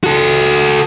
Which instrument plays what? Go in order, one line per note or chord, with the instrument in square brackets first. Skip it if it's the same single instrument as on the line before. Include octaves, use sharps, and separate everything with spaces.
[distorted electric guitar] F#4 A4